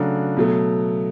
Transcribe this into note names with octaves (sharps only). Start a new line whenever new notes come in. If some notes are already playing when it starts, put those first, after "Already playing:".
Already playing: C#3 F#3 A3 D4 F#4
B2 F#3 A3